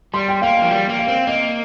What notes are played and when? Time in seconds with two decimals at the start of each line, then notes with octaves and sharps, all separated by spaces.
0.14 G3 C6
0.28 G5
0.42 A#3 F5
0.57 G5
0.62 F3
0.71 G3
0.89 A#3
0.99 F5
1.08 C4
1.27 A#3 D#5